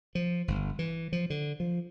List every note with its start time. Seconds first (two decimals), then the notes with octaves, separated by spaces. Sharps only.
0.15 F3
0.48 G1
0.79 E3
1.13 F3
1.30 D3
1.60 F3